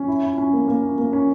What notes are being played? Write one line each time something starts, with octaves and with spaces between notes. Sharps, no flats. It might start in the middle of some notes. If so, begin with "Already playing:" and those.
Already playing: C#4
E4
E4
C#4
A#3
A#3
C#4
A#3
C#4